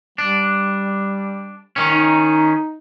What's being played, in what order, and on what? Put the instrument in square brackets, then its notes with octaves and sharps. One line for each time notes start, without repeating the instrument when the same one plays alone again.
[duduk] G3 [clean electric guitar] D4
[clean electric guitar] D#3 C#4
[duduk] D#4